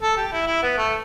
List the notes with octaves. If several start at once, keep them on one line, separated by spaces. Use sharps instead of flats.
A4
G4
E4
E4
B3
A3